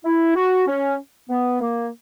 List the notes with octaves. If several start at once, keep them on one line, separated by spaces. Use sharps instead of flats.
E4
F#4
C#4
B3
A#3